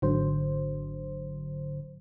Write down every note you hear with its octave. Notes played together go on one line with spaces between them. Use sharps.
G#1 G#2 D3 F#3 C5